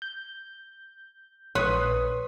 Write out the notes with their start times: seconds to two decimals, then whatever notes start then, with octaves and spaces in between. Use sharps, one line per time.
0.02 G6
1.55 A#1 B4 C#5 C6 D#6